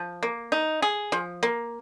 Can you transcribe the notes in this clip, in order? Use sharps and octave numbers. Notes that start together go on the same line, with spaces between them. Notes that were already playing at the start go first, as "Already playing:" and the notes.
Already playing: F3
A#3
D#4
G#4
F3
A#3